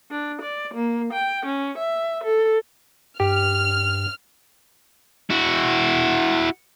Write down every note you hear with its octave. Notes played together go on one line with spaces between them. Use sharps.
D4
D5
A#3
G5
C#4
E5
A4
G2 G4 F6
E4 F#4